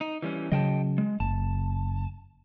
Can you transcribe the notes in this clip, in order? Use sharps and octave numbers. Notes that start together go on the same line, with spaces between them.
D#4
E3 G3 C#4
C#3 F#3 D#5 G5 A5
G#3
F#1 A5